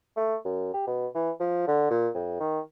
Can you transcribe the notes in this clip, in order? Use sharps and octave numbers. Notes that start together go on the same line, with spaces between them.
A3
F#2
G4
B2
E3
F3
D3
A#2
F2
D#3